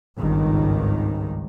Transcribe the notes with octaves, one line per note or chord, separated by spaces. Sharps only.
G#1 C#2 G2 D#3